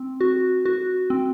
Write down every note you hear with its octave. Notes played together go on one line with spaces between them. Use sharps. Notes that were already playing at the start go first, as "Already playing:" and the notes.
Already playing: C4
F#4
F#4
C4